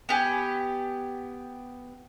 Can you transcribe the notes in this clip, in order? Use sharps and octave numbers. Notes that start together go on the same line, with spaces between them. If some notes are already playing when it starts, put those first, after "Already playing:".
B3 G4 G#5